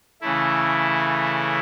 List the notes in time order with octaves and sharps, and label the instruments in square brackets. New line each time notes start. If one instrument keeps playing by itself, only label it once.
[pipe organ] C#3 E3 A3 E4